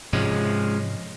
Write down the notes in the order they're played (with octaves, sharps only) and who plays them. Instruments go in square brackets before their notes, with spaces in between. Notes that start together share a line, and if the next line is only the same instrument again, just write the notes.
[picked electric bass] G#2 C3 [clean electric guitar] F3 G#3 C#4